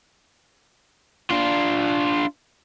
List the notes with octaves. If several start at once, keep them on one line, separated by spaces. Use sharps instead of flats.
D4 F4